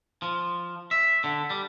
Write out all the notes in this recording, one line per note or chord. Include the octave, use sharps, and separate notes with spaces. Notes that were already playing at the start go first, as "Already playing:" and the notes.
F3
E5
D3
G3